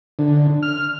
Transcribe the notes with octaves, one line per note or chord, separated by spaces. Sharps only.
D3
F6